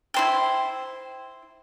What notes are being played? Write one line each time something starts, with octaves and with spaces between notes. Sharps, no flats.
E4 C5 G5